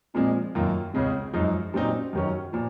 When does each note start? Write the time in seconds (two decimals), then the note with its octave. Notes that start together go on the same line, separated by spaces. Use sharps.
0.15 A#2 F3 G#3 C4
0.55 F#2 D#3 A#3 F4
0.94 C#2 C#3 G#3 C4
1.33 F#2 F3 G#3 D#4
1.74 A#2 F#3 C4 C#4 D#4
2.13 F#2 D#3 F#3 C#4
2.53 A#2 F3